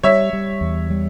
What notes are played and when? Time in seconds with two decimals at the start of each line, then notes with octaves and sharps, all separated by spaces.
0.03 G3 C#5 E5
0.33 G3
0.61 E2
0.90 G3